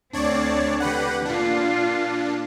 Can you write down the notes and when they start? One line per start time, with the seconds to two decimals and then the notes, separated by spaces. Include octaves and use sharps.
0.13 D2 C4 D4 C#5 D5
0.80 D3 G4 B4 F#5
1.25 A#2 D4 F4